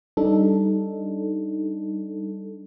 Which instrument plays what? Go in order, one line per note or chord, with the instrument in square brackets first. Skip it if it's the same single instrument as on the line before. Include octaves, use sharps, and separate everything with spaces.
[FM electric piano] G3 D4 D#4 A4